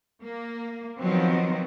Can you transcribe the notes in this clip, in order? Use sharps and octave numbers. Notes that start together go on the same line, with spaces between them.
A#3
D#3 F3 F#3 B3 C4